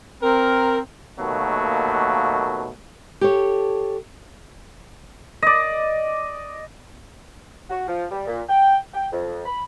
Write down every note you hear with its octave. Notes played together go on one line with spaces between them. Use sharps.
C4 A#4
D#2 B2 F#3 A3 A#3
G4 A4 C#5
D5 D#5
F#4
F3
G3
A#2
G5
G5
F2
B5